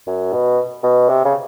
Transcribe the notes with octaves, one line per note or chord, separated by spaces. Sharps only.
F#2
B2
B2
C3
C#3